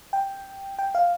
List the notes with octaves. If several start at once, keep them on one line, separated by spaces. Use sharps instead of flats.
G5
G5
F5